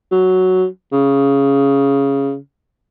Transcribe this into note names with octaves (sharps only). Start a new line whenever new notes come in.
F#3
C#3